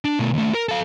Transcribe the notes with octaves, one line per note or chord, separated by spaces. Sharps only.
D4
B2 A3
D#2 A3
A#4
A4 F5